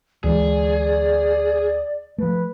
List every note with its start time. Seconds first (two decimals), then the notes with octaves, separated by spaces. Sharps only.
0.24 D2 E3 G#3 G#4 D5
2.18 F3 A3 B4